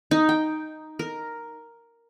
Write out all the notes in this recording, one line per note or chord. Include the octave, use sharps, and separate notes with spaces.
D#4
G5
A#4